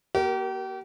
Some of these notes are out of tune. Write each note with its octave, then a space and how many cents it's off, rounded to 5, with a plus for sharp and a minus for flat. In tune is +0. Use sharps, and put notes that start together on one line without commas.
A#3 +20 G4 -40 A#4 -5